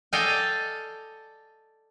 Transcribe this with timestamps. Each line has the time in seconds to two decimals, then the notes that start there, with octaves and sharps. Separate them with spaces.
0.13 A4 D5 D#5 F5 G5 G#5